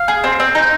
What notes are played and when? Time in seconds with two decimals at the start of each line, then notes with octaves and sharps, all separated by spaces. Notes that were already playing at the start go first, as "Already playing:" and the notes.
Already playing: F5
0.08 G#4
0.24 C4
0.40 C4
0.55 D#4